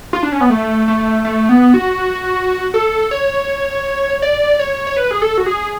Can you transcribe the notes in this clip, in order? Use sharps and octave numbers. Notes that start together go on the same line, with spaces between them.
F4
D4
C#4
B3
A3
A3
A3
B3
F#4
A4
C#5
D5
C#5
C#5
B4
G#4
A4
F#4
G#4